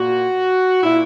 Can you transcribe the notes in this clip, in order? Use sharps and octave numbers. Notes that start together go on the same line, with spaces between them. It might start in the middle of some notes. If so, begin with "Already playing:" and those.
Already playing: A#2 F#4
A#2 E4